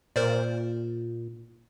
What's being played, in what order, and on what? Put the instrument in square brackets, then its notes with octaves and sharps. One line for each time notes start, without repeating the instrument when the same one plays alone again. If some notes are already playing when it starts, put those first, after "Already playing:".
[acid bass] A#2 [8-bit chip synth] A#4 C5 D5